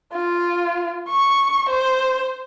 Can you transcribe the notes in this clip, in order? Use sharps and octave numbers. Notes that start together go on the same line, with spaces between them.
F4
C#6
C5